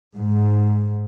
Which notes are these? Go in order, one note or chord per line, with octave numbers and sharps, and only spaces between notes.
G#2